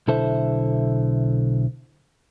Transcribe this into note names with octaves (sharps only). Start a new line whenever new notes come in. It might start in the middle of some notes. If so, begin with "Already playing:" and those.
B1 D3 E4 A4 C5 E5